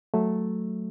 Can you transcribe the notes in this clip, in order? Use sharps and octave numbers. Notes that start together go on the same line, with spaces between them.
F#3 A3